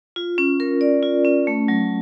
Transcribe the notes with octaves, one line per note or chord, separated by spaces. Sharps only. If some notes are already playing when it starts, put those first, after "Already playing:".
F4
C#4
A#4
D5
F4
C#4
A3
F#3